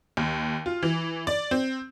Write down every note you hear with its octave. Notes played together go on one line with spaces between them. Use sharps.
D#2
F4
E3
D5
C4